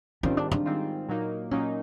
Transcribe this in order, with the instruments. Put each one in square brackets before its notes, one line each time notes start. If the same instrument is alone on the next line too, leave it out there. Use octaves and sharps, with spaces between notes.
[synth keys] G#2 D#3 G3 C4 F4 [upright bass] C#4
[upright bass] D4
D4
[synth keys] G#2 D#3 G3 C4 F4
A#2 F#3 A#3 D#4
[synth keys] A#2 F#3 A#3 D#4 [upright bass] C#4